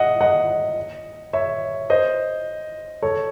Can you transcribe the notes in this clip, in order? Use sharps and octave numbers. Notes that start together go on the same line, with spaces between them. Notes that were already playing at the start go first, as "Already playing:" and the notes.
Already playing: D#5 E5 F#5
D#5 F#5
C#5 E5
C5 D#5
A4 C#5